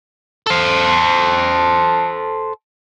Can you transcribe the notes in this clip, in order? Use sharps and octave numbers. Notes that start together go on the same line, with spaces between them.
A4 C5